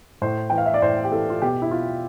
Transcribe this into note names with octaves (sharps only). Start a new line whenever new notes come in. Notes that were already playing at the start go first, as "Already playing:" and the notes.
A2 C5
E3 G5
F5
E5
D5
A2 C5
G4
E3 A4
F4
B2 G4
E4
F4